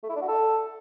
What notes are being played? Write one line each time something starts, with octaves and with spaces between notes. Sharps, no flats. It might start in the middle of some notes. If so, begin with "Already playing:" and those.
A3
E4
D4
F#4
A4